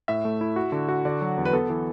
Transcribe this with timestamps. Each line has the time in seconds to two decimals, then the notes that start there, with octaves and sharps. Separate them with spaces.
0.08 A2 E5
0.25 A3
0.41 E4
0.56 F#4
0.72 D3
0.89 F#4
1.05 D3 D5
1.21 F#3
1.38 E2
1.45 B4
1.53 B3 A4
1.70 E3